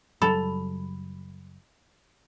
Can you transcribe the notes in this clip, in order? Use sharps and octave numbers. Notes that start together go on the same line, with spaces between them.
F#1 F#3 G3 A4 B5